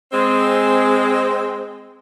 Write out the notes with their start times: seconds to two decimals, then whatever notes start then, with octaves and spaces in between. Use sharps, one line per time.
0.13 G#3 C4